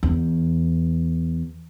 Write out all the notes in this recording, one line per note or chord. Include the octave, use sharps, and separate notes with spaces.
E2